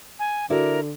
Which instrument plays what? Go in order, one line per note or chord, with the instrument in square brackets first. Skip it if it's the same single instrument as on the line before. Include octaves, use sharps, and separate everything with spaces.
[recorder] G#5
[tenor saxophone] D3 [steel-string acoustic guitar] E4 F#4 D5 [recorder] A#4